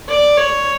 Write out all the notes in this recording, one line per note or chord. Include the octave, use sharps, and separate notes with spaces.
D5
C#5